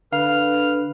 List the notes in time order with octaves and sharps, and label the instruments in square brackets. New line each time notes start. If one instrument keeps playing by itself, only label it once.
[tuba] D3 [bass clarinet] B4 [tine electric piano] F5 [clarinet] F6